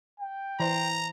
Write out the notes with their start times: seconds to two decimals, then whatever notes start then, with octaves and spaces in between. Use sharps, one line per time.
0.20 G5
0.60 E3 C5 A#5